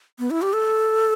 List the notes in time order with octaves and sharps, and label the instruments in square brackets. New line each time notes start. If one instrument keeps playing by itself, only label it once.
[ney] B3
E4
G4
A4